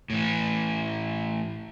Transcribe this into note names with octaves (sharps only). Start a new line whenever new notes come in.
A2 E3